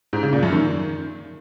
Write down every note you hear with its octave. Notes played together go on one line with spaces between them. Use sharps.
G#2
C#3
A#2
F#2
D#3